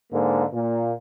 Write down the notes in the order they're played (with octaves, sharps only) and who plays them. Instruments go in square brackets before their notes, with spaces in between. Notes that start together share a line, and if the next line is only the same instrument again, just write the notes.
[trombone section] G#2 D3 A#3
A#2 A#3